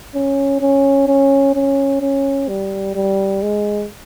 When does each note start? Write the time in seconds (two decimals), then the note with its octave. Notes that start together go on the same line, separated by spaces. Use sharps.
0.15 C#4
0.61 C#4
1.08 C#4
1.55 C#4
2.01 C#4
2.48 G3
2.95 G3
3.42 G#3